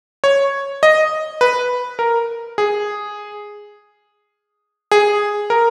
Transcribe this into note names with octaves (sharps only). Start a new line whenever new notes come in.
C#5
D#5
B4
A#4
G#4
G#4
A#4